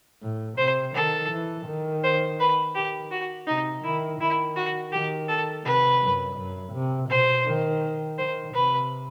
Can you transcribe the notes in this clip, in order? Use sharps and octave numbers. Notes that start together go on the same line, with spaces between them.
A2
C3 C5
D#3 A4
E3
D#3
C5
B4
D#3 G4
F#4
C3 D#4
D#3 E4
D#3 E4
F#4
D#3 G4
A4
C3 B4
F#2
F#2
C3
B2 C5
D#3
D#3 C5
C3 B4